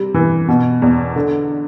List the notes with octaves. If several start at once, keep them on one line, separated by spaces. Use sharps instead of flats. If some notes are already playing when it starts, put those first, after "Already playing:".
Already playing: C3 G3
E3
B2
E2
D3